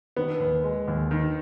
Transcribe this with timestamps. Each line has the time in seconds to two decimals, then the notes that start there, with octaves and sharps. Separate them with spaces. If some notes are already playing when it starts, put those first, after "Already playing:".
0.16 D#3 B3
0.40 D#2
0.64 G#3
0.88 D#2
1.11 D#3